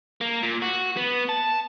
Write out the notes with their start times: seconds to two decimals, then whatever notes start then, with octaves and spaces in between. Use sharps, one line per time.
0.21 A#3
0.43 A#2
0.62 F#4
0.97 B3
1.29 A5